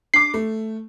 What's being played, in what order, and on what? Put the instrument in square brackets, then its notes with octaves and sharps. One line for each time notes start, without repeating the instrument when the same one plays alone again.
[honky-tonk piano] D4 D6 [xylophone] C7
[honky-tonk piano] A3